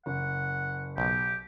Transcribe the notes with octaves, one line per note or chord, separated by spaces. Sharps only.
F#1 F#5
B1 G4